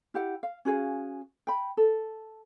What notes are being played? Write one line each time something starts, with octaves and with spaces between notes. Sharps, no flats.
E4 G4 F#5
F5
C#4 F#4 G#4 F5
G5 B5
A4